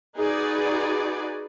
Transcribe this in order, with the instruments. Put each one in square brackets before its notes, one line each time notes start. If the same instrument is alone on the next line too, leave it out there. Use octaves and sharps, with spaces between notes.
[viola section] D#4 F#4 G#4 B4 D5